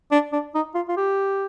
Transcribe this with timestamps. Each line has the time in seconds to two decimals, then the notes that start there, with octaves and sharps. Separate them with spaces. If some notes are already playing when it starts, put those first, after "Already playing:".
0.12 D4
0.32 D4
0.55 D#4
0.74 F4
0.88 F4
0.97 G4